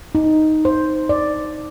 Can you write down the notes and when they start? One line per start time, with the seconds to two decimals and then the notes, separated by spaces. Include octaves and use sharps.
0.15 D#4
0.65 C5
1.09 D5